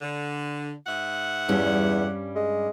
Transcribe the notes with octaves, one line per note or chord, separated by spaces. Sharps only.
D3
G#2 E5 F#5
E2 G2 G3 C#4
G#3